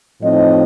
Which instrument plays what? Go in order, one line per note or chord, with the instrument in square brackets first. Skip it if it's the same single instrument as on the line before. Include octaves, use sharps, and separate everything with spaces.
[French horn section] A2 F3 C4 D#4 D#5